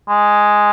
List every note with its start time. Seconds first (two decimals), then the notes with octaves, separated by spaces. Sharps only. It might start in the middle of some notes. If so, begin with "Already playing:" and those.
0.09 G#3